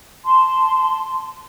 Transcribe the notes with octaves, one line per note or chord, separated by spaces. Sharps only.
A5 C6